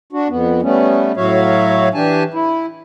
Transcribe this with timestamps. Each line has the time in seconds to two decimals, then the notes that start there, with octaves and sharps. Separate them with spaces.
0.13 D4 F#4
0.29 F2 B3
0.62 G3 A3 B3 C#4
1.17 A2 F#3 F#4 C#5 E5 F5
1.94 E3 D4 G4 G#5 A5
2.34 E4